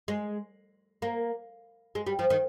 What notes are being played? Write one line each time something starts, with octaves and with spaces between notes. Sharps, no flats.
G#3
A#3
G#3
G3
F3
D#3